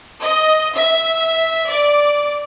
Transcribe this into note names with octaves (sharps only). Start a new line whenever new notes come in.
D#5
E5
D5